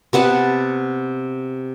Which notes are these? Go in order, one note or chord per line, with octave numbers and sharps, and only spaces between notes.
C3 B3 F#5 A5